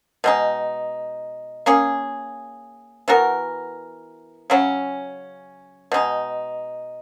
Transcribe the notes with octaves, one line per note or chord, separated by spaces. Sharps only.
B2 G#3 D#4
A#3 C#4 G#4
E3 B3 F#4 A#4
C#3 F#3 C#4
B2 G#3 D#4